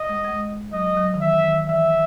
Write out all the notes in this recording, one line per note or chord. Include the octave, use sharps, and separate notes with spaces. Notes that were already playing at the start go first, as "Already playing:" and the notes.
Already playing: D#5
G#3
G#3
F#3 D#5
F#3
D#3
E3 E5
D#3
E3 E5